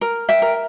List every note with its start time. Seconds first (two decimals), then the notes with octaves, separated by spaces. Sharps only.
0.01 A#4
0.29 E5 G5
0.42 A#4